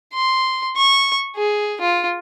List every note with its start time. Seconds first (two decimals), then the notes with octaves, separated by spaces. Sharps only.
0.14 C6
0.77 C#6
1.36 G#4
1.81 F4